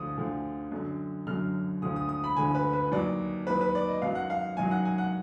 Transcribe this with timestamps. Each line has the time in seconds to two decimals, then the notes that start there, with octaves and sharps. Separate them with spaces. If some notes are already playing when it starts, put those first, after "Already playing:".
Already playing: D2 D3 F3 D#6
0.17 D2 D3 F3
0.72 F#2 D3 F#3
1.27 F#2 D3 F#3 F6
1.82 D2 D3 F3 D#6
1.96 D#6
2.09 D#6
2.24 B5
2.36 D2 D3 F3 G#5
2.55 B4
2.73 B4
2.92 D#2 D#3 F#3 D5
3.47 D#2 D#3 F#3 B4
3.61 B4
3.75 D5
3.89 D#5
4.02 F#2 D#3 F#3 F5
4.15 F#5
4.30 F5
4.57 F#2 D#3 F#3 G#5
4.71 F#5
4.85 G#5
4.98 F#5